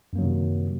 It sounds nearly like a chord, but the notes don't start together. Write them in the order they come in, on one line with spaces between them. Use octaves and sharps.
F#2 A#3 F#3 D#3 C3